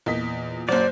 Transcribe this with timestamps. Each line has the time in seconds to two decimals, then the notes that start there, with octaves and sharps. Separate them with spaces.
0.06 E2 A#2 D#5 B6
0.69 F#1 F#3 C5 D5